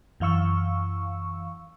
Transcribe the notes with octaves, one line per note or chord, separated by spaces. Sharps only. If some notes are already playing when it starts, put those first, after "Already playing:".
F#2 E3 F5 C#6 E6